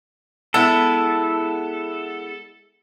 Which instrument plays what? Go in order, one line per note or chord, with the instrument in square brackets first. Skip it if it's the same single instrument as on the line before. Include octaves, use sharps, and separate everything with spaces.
[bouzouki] G#3 B3 E4 [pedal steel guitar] A4